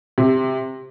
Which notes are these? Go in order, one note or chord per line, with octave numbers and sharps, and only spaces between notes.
C3